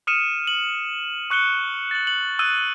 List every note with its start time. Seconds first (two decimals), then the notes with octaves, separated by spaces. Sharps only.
0.07 D#6 F6 C#7 D#7 E7
0.47 F#7
1.30 C#6 F#6 C#7 G7
1.91 A6 F#7
2.07 F#7
2.39 D#6 E6 F#6 G#6 D#7